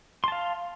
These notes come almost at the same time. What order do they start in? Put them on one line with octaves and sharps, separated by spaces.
C6 A5 F5